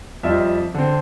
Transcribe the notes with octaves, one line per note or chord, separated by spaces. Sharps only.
F2 G3 F4 D#5 E5
D3 C4